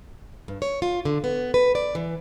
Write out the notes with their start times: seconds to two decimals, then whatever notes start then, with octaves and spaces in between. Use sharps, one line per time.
0.48 G2
0.62 C#5
0.82 F4
1.05 D3
1.24 B3
1.54 B4
1.75 D5
1.95 E3